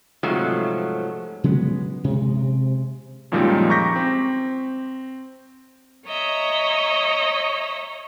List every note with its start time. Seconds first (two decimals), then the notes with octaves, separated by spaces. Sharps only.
0.23 G#2 C3 F3 F#3 A3
1.44 C#3 F#3 G#3 B3
2.04 C3 G#3
3.32 F#2 A#2 D#3 F3 G3 G#3
3.70 A#5 C#6 D6 G6 A#6 B6
3.96 C4
6.07 C#5 D#5 E5 A#5